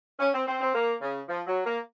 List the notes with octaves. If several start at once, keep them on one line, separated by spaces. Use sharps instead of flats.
C#4
C4
C4
C4
A#3
C#3
F3
F#3
A#3